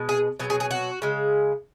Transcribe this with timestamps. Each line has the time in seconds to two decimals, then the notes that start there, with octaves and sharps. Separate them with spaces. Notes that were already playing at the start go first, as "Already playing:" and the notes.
Already playing: B2 G#3
0.09 G#4
0.39 B2 F#3 G#4
0.50 G#4
0.60 G#4
0.71 F#4
1.02 C#3 G#3